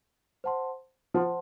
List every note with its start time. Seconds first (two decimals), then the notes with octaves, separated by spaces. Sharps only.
0.44 C5 F#5 A5 C6
1.14 F3 C5 F#5 A5 C6